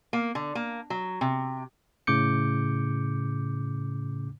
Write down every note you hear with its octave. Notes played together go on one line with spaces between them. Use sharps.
A#3
D3
A#3
F#3
C3
A2 C#3 D6 G6 C#7